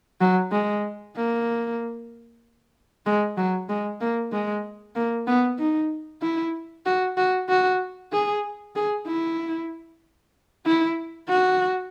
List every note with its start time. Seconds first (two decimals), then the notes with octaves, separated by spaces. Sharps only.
0.21 F#3
0.52 G#3
1.16 A#3
3.06 G#3
3.37 F#3
3.69 G#3
4.00 A#3
4.32 G#3
4.96 A#3
5.27 B3
5.59 D#4
6.22 E4
6.86 F#4
7.17 F#4
7.49 F#4
8.12 G#4
8.76 G#4
9.07 E4
10.66 E4
11.28 F#4